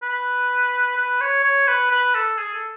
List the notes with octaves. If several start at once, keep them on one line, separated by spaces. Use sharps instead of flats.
B4
B4
C#5
C#5
B4
B4
A4
G#4
A4